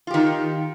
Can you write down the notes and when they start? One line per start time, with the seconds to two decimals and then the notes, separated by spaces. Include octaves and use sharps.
0.07 F4
0.11 G4
0.14 D#3